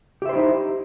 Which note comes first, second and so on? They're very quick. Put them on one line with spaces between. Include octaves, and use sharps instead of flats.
G4 E5 C5 E4 D#4